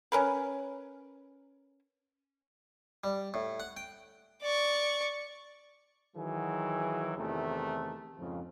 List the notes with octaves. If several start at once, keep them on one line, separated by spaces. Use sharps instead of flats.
C#4 A#4 B4
G3
A2
F#5
G5
D5 C#6
D#3 E3 F#3 F#4 G#4
E2 C3 D#3 E3 A3
F2 G#2 C#3 F3